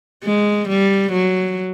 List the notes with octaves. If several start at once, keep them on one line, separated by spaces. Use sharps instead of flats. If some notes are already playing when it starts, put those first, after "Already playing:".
G#3
G3
F#3